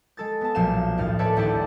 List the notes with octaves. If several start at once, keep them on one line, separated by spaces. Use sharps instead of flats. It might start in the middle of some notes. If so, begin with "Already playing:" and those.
G#3 A4 A6
B3 A5
B1 A#2 F3 F5 E7
D#2 A2 F6 A6
A4 B4 C#5 D5 A5
G#1 D2 E4 G4 D5 A5